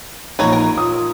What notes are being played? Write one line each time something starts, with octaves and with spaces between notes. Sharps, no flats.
A#1 D#4 B4 C#5 A#5
A#4
F4 D#6